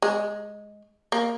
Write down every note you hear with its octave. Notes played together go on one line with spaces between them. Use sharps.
G#3
A#3